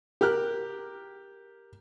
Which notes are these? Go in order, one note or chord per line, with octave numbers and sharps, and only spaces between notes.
G4 A#4 F6 F#6